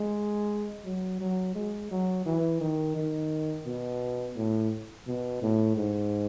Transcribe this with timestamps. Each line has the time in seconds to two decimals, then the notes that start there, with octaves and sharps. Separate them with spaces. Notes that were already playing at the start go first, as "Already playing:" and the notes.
Already playing: G#3
0.85 F#3
1.21 F#3
1.55 G#3
1.91 F#3
2.26 E3
2.61 D#3
2.96 D#3
3.66 B2
4.37 A2
5.07 B2
5.42 A2
5.77 G#2